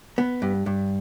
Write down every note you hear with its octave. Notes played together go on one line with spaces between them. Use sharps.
B3
G2
G2